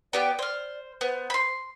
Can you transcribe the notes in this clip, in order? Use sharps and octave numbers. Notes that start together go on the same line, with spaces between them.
B3 G4 D5 G5
C5 D5 F6
B3 C5
B5 C6